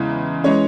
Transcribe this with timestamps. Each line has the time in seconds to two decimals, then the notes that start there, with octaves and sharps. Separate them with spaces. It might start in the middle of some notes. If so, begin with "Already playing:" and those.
Already playing: E2 C#3 G#3 E4
0.44 E3 G#3 C#4 C#5